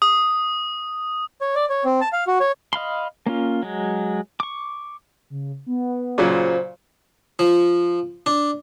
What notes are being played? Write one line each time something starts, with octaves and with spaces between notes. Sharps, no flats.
D#6
C#5
D5
C#5
C4
A5
F5
F#4
C#5
D#5 F5 B5 C6
A#3 C#4 F4
F#3 G#3
C#6 D6
C#3
B3
A#2 C#3 F#3 C5
F3
D4